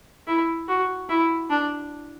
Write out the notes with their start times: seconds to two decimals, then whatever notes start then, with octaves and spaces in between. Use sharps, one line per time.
0.27 E4
0.68 F#4
1.09 E4
1.50 D4